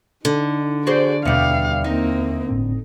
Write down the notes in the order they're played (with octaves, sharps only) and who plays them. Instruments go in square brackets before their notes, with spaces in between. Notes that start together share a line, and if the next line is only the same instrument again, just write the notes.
[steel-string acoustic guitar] D3 [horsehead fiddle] D#4
[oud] F#4 G#4 C5 [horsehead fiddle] D5
[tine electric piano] D#2 E5 C#7 [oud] B2 G3 [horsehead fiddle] F5
[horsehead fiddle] A#3 C4 [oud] D#4
[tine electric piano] G1 A2 C4